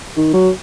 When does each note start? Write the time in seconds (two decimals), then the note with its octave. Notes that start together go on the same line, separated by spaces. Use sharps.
0.17 D#3
0.34 F#3